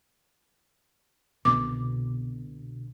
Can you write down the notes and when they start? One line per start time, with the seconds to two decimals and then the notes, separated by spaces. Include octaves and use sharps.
1.45 C2 B2 D3 D6